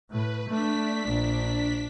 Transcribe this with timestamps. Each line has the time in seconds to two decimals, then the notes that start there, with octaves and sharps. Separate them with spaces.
0.10 A2 B4
0.49 A3 D4 B6
1.08 A#1